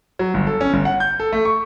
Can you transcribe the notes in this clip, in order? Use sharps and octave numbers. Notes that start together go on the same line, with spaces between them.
F#3
G1
A4
C#4
G1
F#5
G6
A4
A3
C#6